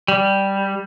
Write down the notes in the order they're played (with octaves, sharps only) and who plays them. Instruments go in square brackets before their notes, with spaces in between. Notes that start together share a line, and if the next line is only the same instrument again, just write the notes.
[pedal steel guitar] G3